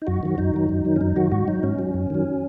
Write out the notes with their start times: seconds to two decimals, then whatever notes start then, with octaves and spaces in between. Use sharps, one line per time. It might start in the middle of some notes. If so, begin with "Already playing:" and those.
0.02 D#4
0.07 F#2 F#4
0.23 D#3 F#3
0.38 F#2 D#4
0.54 D#3 F#3
0.69 F#2
0.85 D#3 F#3
0.96 C#4
1.01 F#2 D#4
1.16 D#3 F#3 F#4
1.32 G#2 F#4
1.48 F#3 D#4
1.63 G#2 C#4
1.79 F#3
1.94 F#2
2.10 D#3 F#3